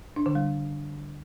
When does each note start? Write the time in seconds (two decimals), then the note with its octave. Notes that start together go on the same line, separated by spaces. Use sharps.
0.16 D4
0.26 D3
0.35 G3